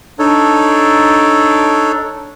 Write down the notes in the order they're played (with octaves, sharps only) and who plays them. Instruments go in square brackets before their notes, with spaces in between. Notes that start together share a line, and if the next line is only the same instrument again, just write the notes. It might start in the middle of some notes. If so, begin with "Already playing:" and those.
[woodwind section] D4 [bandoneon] D#4 A4 C#5